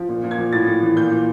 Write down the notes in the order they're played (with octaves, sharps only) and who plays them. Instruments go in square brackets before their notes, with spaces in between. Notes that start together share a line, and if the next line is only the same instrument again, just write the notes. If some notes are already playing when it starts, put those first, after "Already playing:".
Already playing: [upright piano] F3
A#2
A#2
G#6
F3
A2 A6
A2
E3
A#2 G6
A#2